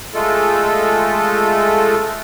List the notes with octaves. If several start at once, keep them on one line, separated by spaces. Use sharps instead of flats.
G#3 A3 F4 A4